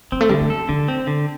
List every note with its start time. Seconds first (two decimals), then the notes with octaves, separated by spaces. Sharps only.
0.12 G3 C4
0.21 A3
0.29 D3 G3
0.41 C4
0.50 A4
0.69 D3 G3
0.88 C4
1.07 D3